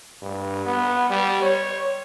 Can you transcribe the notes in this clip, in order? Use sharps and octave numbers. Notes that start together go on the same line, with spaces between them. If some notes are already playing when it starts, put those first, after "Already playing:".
G2
B3
G3
C#5